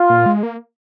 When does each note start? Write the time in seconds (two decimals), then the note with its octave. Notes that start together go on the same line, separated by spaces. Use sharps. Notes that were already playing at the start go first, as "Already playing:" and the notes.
Already playing: F4
0.09 A#2
0.26 G#3
0.43 A#3